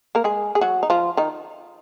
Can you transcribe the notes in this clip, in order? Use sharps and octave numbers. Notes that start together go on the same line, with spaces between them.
A#3 A#4
G#3 G#4
G#4
F#3 F#4
D#4
F3 F4
D#3 D#4